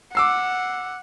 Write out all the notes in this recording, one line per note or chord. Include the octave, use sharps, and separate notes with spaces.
F#5 D6 E6 C7